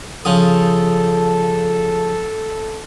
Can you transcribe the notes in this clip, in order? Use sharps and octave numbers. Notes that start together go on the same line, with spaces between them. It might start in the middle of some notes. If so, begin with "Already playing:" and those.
C#3 F3 A4 D#6